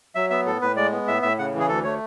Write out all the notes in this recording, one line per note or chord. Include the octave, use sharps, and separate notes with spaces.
F#3 E5
B3 E5
A2 A4
A2 B4
G#3 D5
B3
A2 E5
A2 E5
C#3 F#5
E3
G#4
D2 A4
A3 C#5